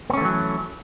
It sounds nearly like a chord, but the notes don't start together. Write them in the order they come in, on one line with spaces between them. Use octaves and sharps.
B3 C#4 A3 E3 F#3